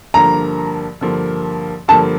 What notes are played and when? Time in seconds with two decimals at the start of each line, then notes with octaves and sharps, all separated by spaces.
0.14 G2 D3 F3 A#3 A#5
1.01 G2 D3 F3 A#3
1.88 G2 D3 F3 A#3 A5